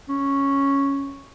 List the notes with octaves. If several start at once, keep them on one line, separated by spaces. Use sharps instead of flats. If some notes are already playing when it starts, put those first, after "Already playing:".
C#4